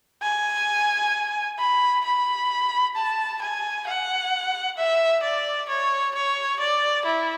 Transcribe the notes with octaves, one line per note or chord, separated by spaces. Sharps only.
G#5
B5
B5
A5
G#5
F#5
E5
D5
C#5
C#5
D5
E4